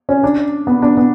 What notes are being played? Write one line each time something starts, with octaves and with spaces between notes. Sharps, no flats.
C#4
D4
B3
D4
B3